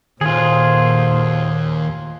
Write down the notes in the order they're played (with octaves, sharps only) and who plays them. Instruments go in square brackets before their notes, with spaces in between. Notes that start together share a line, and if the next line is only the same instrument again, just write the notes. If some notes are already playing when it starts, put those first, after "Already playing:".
[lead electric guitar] D#2 [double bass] A#2 [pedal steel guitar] F4 G#4 [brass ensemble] F#4 A4 C5